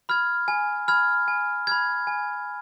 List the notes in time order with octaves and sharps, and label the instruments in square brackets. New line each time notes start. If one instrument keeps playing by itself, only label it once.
[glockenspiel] B5 F6 G#6
G#5
B5 F6 G#6
G#5
B5 F6 G#6
G#5